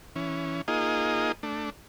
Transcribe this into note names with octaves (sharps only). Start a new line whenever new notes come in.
E3 C#4
A#3 D#4 F4 G#4 D#5
A3 D4